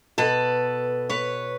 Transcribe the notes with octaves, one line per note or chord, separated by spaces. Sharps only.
B2 A4 B4
B4 C#5